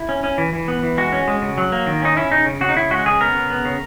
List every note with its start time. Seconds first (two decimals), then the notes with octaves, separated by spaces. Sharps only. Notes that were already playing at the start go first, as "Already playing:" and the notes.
Already playing: E4
0.09 C#4
0.24 C#4
0.38 E3
0.53 E3
0.68 B3
0.83 E3
0.97 G#3 F#4
1.13 C#4
1.28 G#3
1.42 C#3
1.58 F#3
1.72 A#3
1.87 D#3
2.02 C#4 D#4
2.17 C#4 E4
2.32 C#3 D#4
2.46 C#3
2.61 C#3 F#4
2.69 D#4
2.76 C#3 E4
2.91 G#3 F#4
3.06 C#3 G#4
3.20 B3 A#4
3.35 C#3
3.50 B3
3.65 C#3